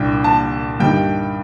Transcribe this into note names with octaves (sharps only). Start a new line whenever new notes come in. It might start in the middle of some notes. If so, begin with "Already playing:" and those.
Already playing: C2 A#2 G3 D4 G5
A5
G2 D#3 G3 G5